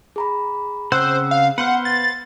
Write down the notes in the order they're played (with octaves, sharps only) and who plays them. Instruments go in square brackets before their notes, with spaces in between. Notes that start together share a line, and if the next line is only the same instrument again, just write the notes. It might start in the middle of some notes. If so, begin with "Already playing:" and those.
[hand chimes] G#4 A#5 B5
[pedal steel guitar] C#3 C4 F#5 [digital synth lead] C5 [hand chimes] E6 F#6
[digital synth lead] F5
[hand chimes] B3 [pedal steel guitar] B4 C5 F5 [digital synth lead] F#5
[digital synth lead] A6